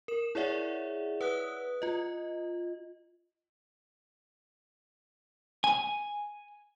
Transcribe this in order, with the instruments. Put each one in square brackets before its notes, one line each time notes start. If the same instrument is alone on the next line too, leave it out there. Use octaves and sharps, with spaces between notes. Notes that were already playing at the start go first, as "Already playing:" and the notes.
[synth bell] A#4 E7
E4 G#4 C#5 D5 E5 F#5
B4 F#5 D#6 F#6
F4 D#5
[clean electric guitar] G#5